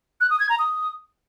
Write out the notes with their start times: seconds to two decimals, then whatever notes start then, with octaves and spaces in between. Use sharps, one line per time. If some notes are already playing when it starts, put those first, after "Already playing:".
0.21 F#6
0.30 D#6
0.40 G#6
0.49 A#5
0.59 D#6